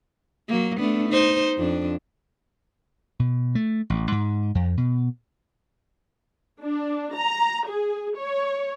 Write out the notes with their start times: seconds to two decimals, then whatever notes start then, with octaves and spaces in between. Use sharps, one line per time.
0.49 F#3 A#3
0.79 A3 B3 D4
1.09 D#4 C5
1.57 F2 D4
3.19 B2
3.55 A3
3.90 A1
4.12 G#2
4.55 F2
4.77 B2
6.62 D4
7.15 A#5
7.67 G#4
8.18 C#5